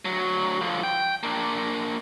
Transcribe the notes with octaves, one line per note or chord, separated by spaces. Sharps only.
D2 F#3
D3 F3
G5
A#3 D4